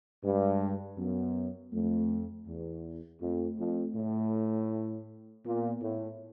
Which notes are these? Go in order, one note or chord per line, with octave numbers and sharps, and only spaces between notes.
G2 G#3
F#2 B3
F2 A3
E2
F2 A3
F2
A2
A#2 B3
A2